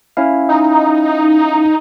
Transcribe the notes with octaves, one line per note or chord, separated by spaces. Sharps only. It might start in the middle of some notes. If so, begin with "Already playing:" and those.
C#4 E4 F5
D#4